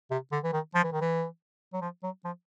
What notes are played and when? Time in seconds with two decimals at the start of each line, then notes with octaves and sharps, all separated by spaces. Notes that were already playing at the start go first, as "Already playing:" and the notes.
0.11 C3
0.32 D3
0.44 E3
0.53 D#3
0.75 F3
0.83 E3
0.92 D#3
1.01 E3
1.73 F#3
1.82 F3
2.03 F#3
2.25 F3